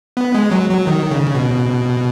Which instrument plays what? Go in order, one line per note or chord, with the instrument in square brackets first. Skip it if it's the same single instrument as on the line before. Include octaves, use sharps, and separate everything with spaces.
[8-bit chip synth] B3
G#3
F#3
F#3
D#3
C#3
B2